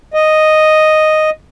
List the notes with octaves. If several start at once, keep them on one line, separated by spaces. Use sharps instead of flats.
D#5